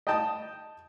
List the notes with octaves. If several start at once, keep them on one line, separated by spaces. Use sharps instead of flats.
D#5 G5 A5 D#6